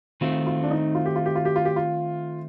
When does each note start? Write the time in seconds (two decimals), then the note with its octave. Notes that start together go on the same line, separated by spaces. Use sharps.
0.21 D#3 A3 C4 F4
0.46 F4
0.63 D4
0.71 D#4
0.95 F4
1.06 G4
1.16 F4
1.26 G4
1.35 F4
1.45 G4
1.56 F4
1.65 G4
1.76 F4